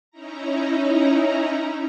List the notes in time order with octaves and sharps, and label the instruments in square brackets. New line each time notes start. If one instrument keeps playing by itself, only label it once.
[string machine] C#4 D#4 E4 A#5